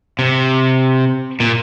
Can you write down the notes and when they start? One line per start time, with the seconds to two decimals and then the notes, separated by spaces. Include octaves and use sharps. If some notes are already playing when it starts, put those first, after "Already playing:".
0.19 C3
1.40 A#2